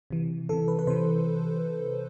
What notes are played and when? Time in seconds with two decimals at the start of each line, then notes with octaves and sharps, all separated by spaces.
0.10 C3 E3
0.49 C3 E3 A4
0.68 B4
0.79 B4
0.87 C3 E3 C5